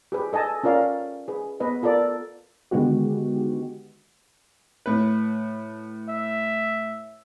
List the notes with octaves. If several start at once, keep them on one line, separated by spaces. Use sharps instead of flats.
G4 G#4 B4
A4 D#5 G#5 A5
C#4 F4 A#4 D5 F5
G#4 B4
B3 B4 D#5
F4 A4 A#4 D5
D3 D#3 G#3 B3 F#4 G4
A2 B4
E5